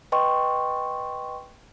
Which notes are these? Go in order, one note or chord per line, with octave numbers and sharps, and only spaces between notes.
B4 D#5 G5 C6 C#6